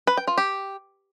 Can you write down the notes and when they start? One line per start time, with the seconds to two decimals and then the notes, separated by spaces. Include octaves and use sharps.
0.07 B4
0.17 G5
0.27 F4
0.38 G4